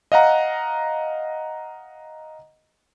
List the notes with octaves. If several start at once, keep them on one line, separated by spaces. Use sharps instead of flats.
D#5 F5 F#5 A#5